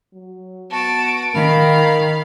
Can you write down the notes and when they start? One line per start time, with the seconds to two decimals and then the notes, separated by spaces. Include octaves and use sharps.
0.13 F#3
0.71 B3 F#4 A5 D7
1.34 D#3 A#4 F5 B5